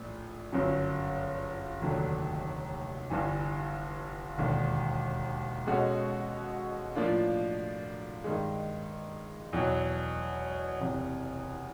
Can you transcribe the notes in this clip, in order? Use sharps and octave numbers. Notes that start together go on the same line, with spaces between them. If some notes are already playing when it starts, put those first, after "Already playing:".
Already playing: A#1 A2
G1 F#2 C#3 F#3
F1 D#2 D3 F#3 A3
G1 G2 E3
E1 D#2 D3
B2 G#3 C#4 F#4 A4
A2 F3 A#3 D4 F4
G2 D#3 G#3
E2 B2 F#3
F#1 E2 C3